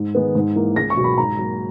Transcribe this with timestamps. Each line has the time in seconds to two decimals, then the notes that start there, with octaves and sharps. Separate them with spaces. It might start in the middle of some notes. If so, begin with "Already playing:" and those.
Already playing: G#2
0.15 D#3 G#3 B3
0.35 G#2
0.56 E3 A#3
0.76 C#2 A#6
0.90 C#6
0.97 B2 F#3
1.04 B5
1.18 G#2 A#5
1.39 F#3 A#3